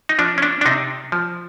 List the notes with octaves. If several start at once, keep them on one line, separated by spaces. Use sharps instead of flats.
D#4
F3 D4
C#4
D4
D4
C3 D#4
F3